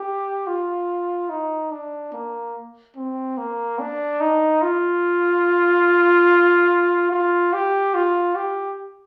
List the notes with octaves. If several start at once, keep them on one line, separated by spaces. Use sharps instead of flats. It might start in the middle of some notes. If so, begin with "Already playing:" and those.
Already playing: G4
F4
D#4
D4
A#3
C4
A#3
D4
D#4
F4
F4
G4
F4
G4